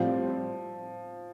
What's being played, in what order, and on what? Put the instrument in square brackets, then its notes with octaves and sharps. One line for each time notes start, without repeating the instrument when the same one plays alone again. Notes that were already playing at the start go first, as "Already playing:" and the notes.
Already playing: [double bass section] A2 G3 C4 [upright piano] F3